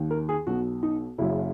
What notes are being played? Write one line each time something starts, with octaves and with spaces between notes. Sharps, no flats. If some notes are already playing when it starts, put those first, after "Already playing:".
Already playing: D#2 D#3
A#4
G#4
B1 B2 F#4
D#4
F#1 F#2 C#3 E4